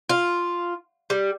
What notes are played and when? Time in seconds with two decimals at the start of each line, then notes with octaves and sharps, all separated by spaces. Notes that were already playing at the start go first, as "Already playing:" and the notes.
0.09 F4
1.10 G3